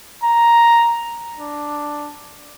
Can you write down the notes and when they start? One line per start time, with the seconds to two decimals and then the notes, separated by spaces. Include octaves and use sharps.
0.23 A#5
1.38 D4